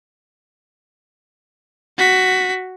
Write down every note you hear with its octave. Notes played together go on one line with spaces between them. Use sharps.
F#4 B6